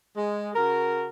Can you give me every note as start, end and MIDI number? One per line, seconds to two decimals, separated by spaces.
0.16 0.50 56
0.55 1.09 49
0.55 1.09 66
0.55 1.09 70